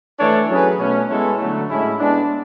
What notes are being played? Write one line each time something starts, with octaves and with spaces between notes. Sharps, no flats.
E3 A3 D4 A4 C#5
F#3 C#4 G#4 B4
B2 A3 C#4
G#3 B3 E4 A4 C#5
D3 F#3 A3
A2 G#3 C#4 E4
G#3 B3 D4